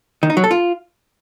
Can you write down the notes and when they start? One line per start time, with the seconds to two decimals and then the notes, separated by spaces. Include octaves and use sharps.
0.23 D#3
0.30 D#4
0.37 F#3
0.44 A4
0.51 F4